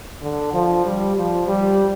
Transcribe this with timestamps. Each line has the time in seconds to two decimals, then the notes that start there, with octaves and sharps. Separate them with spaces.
0.22 D3
0.53 F3
0.85 G3
1.16 F3
1.48 G3